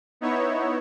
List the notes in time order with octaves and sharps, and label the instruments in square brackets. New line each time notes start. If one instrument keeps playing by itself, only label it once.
[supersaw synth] B3 D#4 E4 C#5